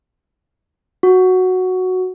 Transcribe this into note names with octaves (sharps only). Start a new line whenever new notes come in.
F#4